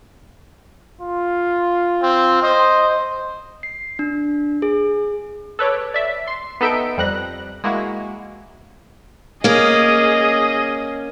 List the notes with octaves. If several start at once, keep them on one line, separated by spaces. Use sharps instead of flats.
F4
C4
C5 D#5
C7
D4
G#4
A4 B4 C#5 D6
D5 E5
C6
B3 D#4 A4 E5 G5 D7
F2 G3 F#6 A#6
G#3 A#3 E4 F#4
A#3 C#4 G#4 D#5